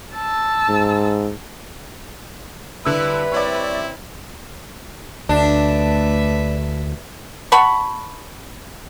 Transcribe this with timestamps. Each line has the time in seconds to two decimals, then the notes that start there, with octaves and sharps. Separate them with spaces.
0.16 A5 E6
0.69 G#2
2.85 D3 G3 E4 B4 E5 E6
3.32 C4 E4 C#5 D5
5.29 D2 A3 D4 B4 E5
7.52 F#5 A5 B5 C#6